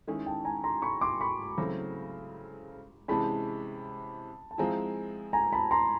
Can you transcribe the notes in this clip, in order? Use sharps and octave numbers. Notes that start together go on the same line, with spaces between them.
D#3 G#3 C#4 E4 G#4
G5 A5
G#5 A#5
A#5 C6
B5 C#6
C6 D6
B5 C#6
C#3 F#3 A3 C4 E4
C3 E3 G#3 C#4 A5 B5
A5
F3 G#3 C4 E4 G#5 A#5
G#5 A#5
A5 B5
A#5 C6